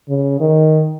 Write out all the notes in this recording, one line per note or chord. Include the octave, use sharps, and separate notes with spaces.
C#3
D#3